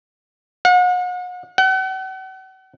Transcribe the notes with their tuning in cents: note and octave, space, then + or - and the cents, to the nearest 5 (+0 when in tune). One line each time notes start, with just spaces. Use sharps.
F#5 -40
F#5 +40